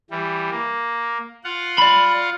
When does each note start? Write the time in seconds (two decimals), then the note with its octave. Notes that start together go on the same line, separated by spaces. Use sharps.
0.11 E3 G3
0.50 A#3
1.44 F4 F5 F#5
1.78 D5 B5